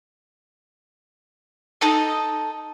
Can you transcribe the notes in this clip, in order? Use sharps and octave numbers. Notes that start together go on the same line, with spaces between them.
D#4 A4 D#5